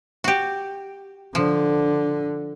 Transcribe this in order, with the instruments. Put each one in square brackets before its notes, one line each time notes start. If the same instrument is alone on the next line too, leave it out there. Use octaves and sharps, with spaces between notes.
[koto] F#4 G4
[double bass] D3 [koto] F3